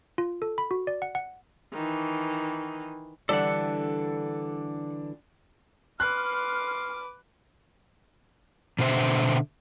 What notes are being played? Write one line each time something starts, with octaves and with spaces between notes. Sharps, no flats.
F4
A4
B5
F#4
D5
F#5
F#5
D#3 E3
D3 E3 G3 D4 A4 F#5
B4 C6 D6 F6 F#6
B2 D3 C5 E5